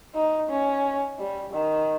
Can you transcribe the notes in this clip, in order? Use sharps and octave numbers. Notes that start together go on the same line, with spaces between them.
D#4
C#4
G3
D#3